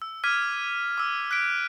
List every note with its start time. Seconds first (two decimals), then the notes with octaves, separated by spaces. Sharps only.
0.02 E6
0.24 D6 F6 G#6 B6 D#7
0.98 D6 E6
1.31 F#6 B6 D7